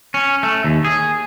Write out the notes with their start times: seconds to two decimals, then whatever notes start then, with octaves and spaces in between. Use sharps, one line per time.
0.14 C#4
0.43 A3
0.64 D#2
0.85 G#4